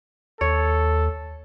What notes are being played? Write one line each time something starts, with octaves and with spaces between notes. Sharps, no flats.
D#2 A4 C#5